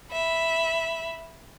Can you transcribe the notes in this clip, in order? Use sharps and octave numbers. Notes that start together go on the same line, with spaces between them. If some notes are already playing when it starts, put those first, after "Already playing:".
E5 B5